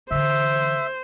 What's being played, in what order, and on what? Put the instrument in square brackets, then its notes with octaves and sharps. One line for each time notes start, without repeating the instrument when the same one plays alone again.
[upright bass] D3 E3 [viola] C5 [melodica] E5